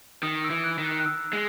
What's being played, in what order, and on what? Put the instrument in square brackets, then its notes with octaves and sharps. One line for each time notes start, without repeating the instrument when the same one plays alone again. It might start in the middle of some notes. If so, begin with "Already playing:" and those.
[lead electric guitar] D#3 [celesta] D#6
[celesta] E6
[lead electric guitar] E3
[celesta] F#6
[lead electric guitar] D#3
[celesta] F#6
F#6
E6
[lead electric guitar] G#3